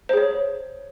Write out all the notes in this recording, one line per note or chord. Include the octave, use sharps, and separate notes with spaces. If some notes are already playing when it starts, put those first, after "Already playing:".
G#4 C5 C#5